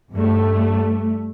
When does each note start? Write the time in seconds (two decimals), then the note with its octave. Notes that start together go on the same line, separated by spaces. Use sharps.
0.12 G2 A3